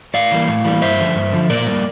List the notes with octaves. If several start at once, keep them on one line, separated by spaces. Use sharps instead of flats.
A2 D5 F5
E3 G3 A#3
A2
E3 G3 A#3
G2 C5 E5
D3 F3
G2
D3 F3
A#2 A#4 D5
G3 A#3